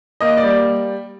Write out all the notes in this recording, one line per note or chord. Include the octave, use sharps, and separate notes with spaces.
A#3 D#5
D5
G3